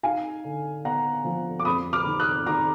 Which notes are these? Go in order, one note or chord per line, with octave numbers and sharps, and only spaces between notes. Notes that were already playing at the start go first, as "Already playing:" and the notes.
D#4 F5 G#5
D3
B3 F#5 A#5
F3
D6
F2 B5 D#6
D6 F6
D#3
D#6 F#6
D#3 A#5 D6